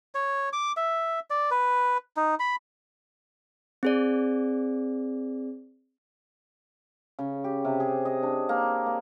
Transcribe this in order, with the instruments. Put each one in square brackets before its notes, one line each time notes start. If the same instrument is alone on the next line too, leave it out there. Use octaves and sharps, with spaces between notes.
[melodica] C#5
D6
E5
D5
B4
D#4
B5
[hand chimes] C4 G#4 D5
[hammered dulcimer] C#3
G4
C3
G#4
D#5
D4
A#3
A#3